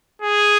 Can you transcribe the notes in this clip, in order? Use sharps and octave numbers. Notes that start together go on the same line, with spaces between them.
G#4